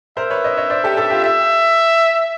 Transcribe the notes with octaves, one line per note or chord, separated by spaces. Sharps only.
A#4 C5 E5
B4 C#5
C#5 D#5
C#5 D#5
C5 D5
G4 A4
G4 A4
F4 G4
E5